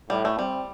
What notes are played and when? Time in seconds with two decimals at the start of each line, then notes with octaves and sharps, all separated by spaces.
0.10 A2 G3
0.25 A3
0.38 G3 C4